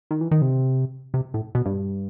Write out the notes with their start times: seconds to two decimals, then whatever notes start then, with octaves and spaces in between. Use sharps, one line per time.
0.11 D#3
0.21 E3
0.31 D#3
0.42 C3
1.14 C3
1.34 A2
1.55 B2
1.66 G2